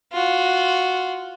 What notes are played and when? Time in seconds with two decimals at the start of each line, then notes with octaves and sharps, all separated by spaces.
0.13 F4 F#4